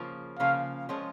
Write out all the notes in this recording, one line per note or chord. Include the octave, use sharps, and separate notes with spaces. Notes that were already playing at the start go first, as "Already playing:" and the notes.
Already playing: C#3 F3 A#3
C#3 F3 A#3 F5
F3 G#3 C#4